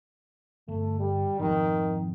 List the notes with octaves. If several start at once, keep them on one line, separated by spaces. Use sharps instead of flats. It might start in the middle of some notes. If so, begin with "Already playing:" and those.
G1 A3
G3
G#1 F2 D#3